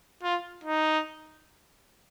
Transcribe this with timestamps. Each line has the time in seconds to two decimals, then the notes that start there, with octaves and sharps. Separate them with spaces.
0.23 F4
0.64 D#4